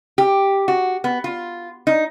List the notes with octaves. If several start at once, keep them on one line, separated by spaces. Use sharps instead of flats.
G4
F#4
B3
F4
D#4